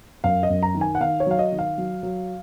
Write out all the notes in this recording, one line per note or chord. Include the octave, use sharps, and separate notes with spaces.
F#2 F5
D#5
F#2
A#5
D#3
G#5
F#5
D#3 F5
C#5
F#3 F5
D#5
D#3
F5
F#3
F#3